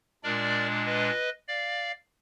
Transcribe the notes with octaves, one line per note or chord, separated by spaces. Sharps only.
A#2 G#3 D4 A#4 D5
B4 D#5
D5 F5